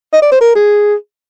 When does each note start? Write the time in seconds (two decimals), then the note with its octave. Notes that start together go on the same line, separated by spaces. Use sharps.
0.13 D#5
0.22 D5
0.32 C5
0.41 A#4
0.56 G#4